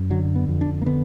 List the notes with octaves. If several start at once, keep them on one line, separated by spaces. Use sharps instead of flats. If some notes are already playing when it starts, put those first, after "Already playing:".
Already playing: F#2
D3 F#3
B3
F2
D4
A#3
D3 B3